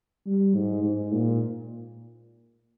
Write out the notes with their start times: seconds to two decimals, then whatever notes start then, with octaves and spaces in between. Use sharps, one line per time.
0.26 G3
0.55 G#2
0.84 G#2
1.13 A#2